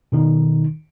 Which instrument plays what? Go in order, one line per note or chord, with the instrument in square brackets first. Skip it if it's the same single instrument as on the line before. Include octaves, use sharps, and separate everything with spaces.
[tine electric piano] B2 D#3 D#4